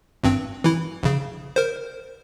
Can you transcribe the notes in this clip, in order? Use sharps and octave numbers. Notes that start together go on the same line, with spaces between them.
G#1 G2 C4
E3 E4
A#1 C#3
A#4 C5